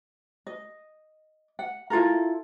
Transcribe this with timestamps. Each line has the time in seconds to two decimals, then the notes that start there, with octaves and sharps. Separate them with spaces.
0.47 D#5
1.59 F#5
1.90 E4 F4 A4 A#4